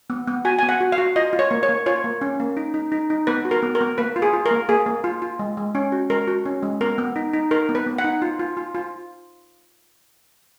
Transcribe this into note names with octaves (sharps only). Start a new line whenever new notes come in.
B3
B3
F#4 G#5
B3 G#5
F#5
F#4
F5
F#4
F4 D#5
F4
C#5
A#3
C#5
A#3
F4 C#5
A#3
C#4
A#3
D#4
D#4
D#4
D#4
B3 B4
F#4
A#4
B3
A#4
B3
A#3 B4
F4
G#4
F4
A#4
A#3
A#3 G#4
A#3
F4
F4
G#3
G#3
C#4
F#4
G#3 A#4
F#4
C#4
G#3
B3 A#4
B3
D#4
D#4
D#4 A#4
B3
B4
B3
F#5
D#4
F4
F4
F4
F4